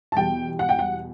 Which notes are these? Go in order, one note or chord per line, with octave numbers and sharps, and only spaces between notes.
A5
E2 B2 G3 G5
F#5
G5
F#5